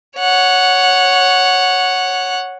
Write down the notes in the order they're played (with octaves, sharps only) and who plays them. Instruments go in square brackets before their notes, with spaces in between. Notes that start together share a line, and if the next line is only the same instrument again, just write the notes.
[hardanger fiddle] C#5 F#5